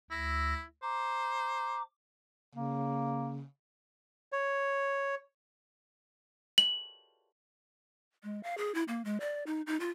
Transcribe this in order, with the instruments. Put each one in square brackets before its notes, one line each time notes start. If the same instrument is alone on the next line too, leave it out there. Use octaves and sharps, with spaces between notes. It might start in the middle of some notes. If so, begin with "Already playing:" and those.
[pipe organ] D2 E6 A#6 [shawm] E4
[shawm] C5 [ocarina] A#5 [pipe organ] D6
[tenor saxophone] C#3 [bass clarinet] A#3
[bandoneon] C#5
[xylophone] F#7
[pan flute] G#3
F5
G#4
E4
A#3
G#3
D5
D#4
D#4
F4